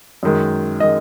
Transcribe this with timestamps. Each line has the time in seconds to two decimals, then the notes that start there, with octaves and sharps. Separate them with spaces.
0.23 F#2 D#3 G#3
0.80 D#3 G#3 D#5